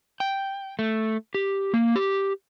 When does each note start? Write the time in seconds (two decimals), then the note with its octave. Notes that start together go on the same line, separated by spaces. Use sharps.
0.20 G5
0.79 A3
1.34 G4
1.74 A#3
1.96 G4